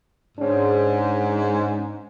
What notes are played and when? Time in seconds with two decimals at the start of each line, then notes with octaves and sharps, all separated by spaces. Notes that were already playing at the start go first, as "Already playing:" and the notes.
0.38 G#2 C#4 D4